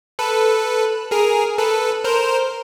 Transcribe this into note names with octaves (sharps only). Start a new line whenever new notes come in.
A4 B4
G#4 A#4
A4 B4
A#4 C5